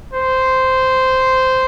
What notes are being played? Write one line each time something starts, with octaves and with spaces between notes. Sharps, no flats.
C5